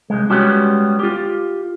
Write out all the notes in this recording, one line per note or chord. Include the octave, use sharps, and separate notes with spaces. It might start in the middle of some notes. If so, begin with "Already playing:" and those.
C2 G#3
G3 G#3 B3 C#4 F#4 G4
F4 G4